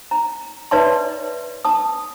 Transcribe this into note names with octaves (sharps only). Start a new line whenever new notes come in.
A#5
B4 C#5 D5 E5 A5 C6
A5 D#6